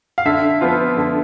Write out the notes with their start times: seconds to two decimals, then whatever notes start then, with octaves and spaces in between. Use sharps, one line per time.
0.18 F5
0.25 D3 E5
0.61 F3 B3 F4
0.97 D3